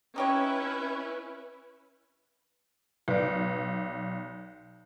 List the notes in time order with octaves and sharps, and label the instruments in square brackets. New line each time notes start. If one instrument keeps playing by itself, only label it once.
[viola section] C#4 E4 B4 [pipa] D#4 G4 C#5
[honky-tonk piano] B1 [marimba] B4 D5